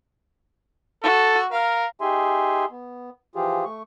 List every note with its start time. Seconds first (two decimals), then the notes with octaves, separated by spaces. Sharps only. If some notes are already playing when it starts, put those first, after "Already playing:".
1.04 F#4 A4
1.52 A#4 F5
2.01 D#4 G4 G#4 E5 G#5 C6
2.71 B3
3.35 E3 F3 F4 G4 G#4
3.65 A3 C#6